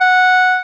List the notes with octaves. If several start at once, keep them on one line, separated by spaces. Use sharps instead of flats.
F#5